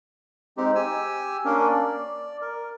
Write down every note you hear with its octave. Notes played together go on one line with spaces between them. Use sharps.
G#3 C4 D#4 G4
G4 G#5 E6
A#3 C#4 D4 A#4
D5
A#4